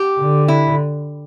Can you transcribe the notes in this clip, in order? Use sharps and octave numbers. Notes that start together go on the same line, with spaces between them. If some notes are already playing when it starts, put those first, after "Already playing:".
Already playing: G4
D3
E4